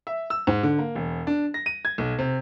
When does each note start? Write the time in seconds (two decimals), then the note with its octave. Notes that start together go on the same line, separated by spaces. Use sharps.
0.07 E5
0.30 E6
0.47 G#2
0.63 D3
0.78 A#3
0.95 E1
1.27 D4
1.54 A#6
1.66 D#7
1.85 G#6
1.98 B1
2.19 C3